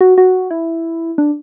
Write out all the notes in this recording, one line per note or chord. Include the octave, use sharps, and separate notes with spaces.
F#4
F#4
E4
D4